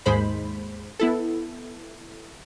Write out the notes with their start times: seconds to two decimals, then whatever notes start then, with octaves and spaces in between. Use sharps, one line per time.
0.06 D#2 G#2 G#3 C5 B5
1.00 B3 E4 A4